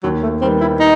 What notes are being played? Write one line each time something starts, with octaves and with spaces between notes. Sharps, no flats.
D#2 F#3
A3
D#3 G3 B3 C4
E4
D#4